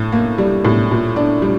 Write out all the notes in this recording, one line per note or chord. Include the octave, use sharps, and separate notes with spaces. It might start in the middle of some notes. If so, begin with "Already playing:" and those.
Already playing: A2
A#3
G3
A2
A#2
D4
G3